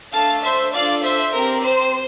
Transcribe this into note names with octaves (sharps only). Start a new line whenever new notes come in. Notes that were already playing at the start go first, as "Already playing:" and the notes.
A3 D4 A4 F5 A5
C5 E5
D4 F4 A4 D5 F5
C5 E5
C4 G4 A#4
C5